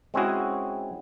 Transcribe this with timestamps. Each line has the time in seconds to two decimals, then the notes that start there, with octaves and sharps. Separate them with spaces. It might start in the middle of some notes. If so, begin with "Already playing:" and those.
0.14 G#3 C4 C#4 E4 F#4 G#4